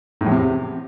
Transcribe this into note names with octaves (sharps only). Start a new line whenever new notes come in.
A2
E2
C3